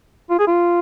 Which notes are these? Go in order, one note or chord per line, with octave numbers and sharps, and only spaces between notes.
F4
G#4
F4